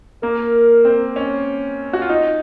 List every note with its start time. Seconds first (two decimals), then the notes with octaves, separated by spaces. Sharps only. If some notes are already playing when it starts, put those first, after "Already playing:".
0.22 A#3 A#4
0.85 C4
1.16 C#4
1.93 F#4
2.02 F4
2.09 D#4